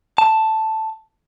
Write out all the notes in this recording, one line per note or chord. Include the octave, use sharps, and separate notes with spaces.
A5